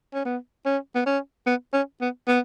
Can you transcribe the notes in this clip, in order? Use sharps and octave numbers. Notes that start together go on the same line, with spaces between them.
C#4
B3
C#4
B3
C#4
B3
C#4
B3
B3